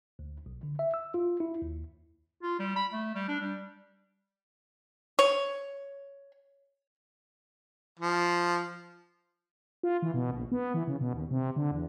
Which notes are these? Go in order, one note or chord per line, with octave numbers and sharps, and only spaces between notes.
D2
B1
D3
E5
E6
F4
E4
D#2
F4
G3
B5
A3
G3
D4
G3
C#5
F3
F4
E3
B2
A#1
B3
E3
C#3
B2
D#2
C3
D3
E2